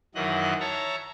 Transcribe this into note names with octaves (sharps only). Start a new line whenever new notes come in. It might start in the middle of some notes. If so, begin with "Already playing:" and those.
F#2 D#3 E3 F#3 D#5 F#6
C#5 E5 A5 A#5